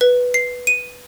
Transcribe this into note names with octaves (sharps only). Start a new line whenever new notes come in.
B4
C7
D#7